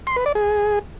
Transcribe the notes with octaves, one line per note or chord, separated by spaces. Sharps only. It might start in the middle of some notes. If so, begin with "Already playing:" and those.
C6
B4
D5
G#4